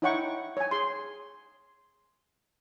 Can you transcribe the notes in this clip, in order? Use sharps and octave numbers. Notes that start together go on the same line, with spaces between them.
D#4 E4 C#5 F#5 G5 C#6
C#5 G#5
G#4 C6